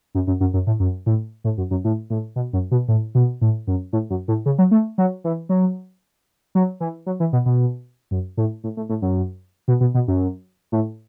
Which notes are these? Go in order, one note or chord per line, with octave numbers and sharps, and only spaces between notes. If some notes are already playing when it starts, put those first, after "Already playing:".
F#2
F#2
F#2
F#2
A2
F#2
A2
A2
F#2
F#2
A2
A2
B2
F#2
B2
A2
B2
A2
F#2
A2
F#2
A2
C#3
F#3
A3
F#3
E3
F#3
F#3
E3
F#3
E3
B2
B2
F#2
A2
A2
A2
A2
F#2
B2
B2
B2
F#2
A2